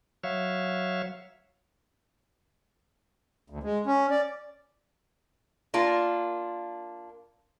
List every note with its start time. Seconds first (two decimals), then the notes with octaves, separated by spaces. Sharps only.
0.24 F#3 C#5 E5 F5
3.50 D2
3.63 G#3
3.86 C#4
4.10 D5
5.74 A#3 D4 F4